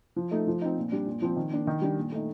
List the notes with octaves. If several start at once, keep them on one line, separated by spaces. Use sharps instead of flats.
F3
A3 D#4
F3
C4 D#4
A#2
G3 D4
A#2
F3 C4
D#3
A#3 D4
D#3
G3 D4
A#2
A3 D#4